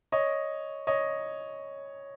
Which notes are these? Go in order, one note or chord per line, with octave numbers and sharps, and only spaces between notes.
C#5 D#5
C#5 D#5